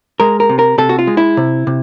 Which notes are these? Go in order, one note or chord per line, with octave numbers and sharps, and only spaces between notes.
G#3 A#4
A#4
C3
A#4
C3 A4
F#4
F4
G#3
E4
C3
C3